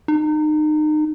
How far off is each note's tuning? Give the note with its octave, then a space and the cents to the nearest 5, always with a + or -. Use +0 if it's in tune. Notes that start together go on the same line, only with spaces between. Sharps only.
D#4 -30